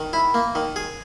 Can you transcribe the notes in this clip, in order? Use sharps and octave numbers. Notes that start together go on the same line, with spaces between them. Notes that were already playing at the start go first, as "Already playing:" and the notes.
Already playing: D#3
E4
A#3
D#3
G#4